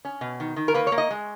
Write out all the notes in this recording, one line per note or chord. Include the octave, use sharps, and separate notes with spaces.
C#4
B2
D#3
D#3
A#4
A#3 B4
C#5
A#3
D#5
G#3